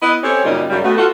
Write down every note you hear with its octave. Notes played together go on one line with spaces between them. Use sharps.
B3 E4 B4 D#5
C4 C#4 G4 A4 C#5
F#2 A#2 C#3 G3 D#4 D#5
F#2 C#3 G3
A3 B3 F#4
F4 F#4 A4